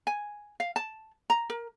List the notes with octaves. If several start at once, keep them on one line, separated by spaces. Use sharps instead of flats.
G#5
F5
A5
A#5
A#4